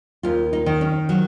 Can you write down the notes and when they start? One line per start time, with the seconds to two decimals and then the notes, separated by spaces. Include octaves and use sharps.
0.23 D#2 F4
0.53 D#4
0.66 D#3
0.81 C#4
1.09 F#3